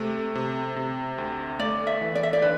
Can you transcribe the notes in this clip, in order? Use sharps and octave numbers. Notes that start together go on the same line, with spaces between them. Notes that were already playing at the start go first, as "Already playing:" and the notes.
Already playing: C3 A3
C3
C3
D2
A3 D5
E5
E3
D5
E5
D5
D3 B4